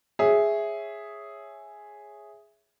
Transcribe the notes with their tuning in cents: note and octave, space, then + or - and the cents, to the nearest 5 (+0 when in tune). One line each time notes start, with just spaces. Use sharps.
G#4 +0 C#5 +0 E5 +0